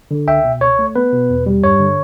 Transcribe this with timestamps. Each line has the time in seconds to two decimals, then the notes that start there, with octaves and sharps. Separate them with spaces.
0.11 D3
0.28 C#2 E5 G5
0.45 B2
0.61 C#2 C#5
0.79 A3
0.96 B3 B4
1.13 B2
1.30 E2
1.46 G3
1.63 G2 C#5
1.80 D3